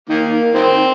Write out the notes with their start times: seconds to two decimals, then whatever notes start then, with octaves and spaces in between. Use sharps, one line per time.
0.10 D#3 A#3
0.54 D#3 C4